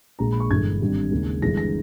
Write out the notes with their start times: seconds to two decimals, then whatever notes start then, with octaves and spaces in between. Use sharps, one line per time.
0.19 A#1 A#2 G#3 A#5
0.32 B5
0.40 C#6
0.50 G1 G2 E3 G#3 G#6
0.81 G#1 G2 D#3 G3
1.11 D#2 C#3 G#3
1.42 G1 G2 E3 G#3 A#6
1.57 A#6